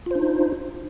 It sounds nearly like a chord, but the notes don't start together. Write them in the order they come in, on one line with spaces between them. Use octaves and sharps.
F4 C5 D4 D#4